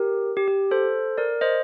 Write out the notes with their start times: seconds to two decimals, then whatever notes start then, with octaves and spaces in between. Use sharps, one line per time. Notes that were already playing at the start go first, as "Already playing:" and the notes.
Already playing: G4 A#4
0.37 G4
0.48 G4
0.71 A4 C5
1.18 A#4 D5
1.41 C5 D#5